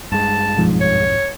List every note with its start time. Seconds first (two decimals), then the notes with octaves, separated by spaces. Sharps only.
0.12 G2 G#3 A5
0.57 B1 F2 G#2
0.81 C#5